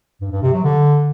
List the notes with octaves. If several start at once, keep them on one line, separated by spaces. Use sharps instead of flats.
G2
G2
C3
F#3
D3